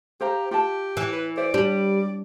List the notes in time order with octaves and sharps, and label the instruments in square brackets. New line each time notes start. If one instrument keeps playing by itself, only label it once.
[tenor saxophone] G4 [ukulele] C5 F5 A#5
[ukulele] F4 A5 [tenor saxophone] G4
[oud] E3
[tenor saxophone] B4
[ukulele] C5 E5 [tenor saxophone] D5
[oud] G3 [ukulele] D4